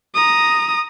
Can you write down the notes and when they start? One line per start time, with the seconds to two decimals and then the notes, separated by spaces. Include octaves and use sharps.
0.15 A#5 D#6